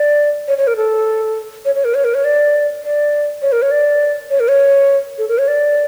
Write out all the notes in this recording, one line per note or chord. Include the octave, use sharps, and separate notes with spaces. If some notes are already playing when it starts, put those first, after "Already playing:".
Already playing: D5
C#5
C#5
A#4
A4
C#5
C#5
A#4
C#5
A#4
C#5
D5
D5
C#5
A#4
C#5
D5
C#5
A#4
C#5
A4
A#4
C#5
D5